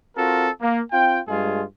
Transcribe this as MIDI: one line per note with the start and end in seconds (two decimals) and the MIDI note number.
0.17 0.48 60
0.17 0.48 65
0.17 0.48 66
0.17 0.48 69
0.17 0.48 70
0.61 0.80 58
0.91 1.19 60
0.91 1.19 65
0.91 1.19 79
1.28 1.62 43
1.28 1.62 56
1.28 1.62 57
1.28 1.62 65
1.28 1.62 68